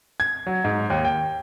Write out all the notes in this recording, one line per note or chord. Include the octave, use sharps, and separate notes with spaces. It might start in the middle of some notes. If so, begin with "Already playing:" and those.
G#6
F#3
G#2
D#2
G5